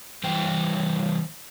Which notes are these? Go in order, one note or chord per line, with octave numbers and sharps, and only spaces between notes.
E3 G3 C5 G5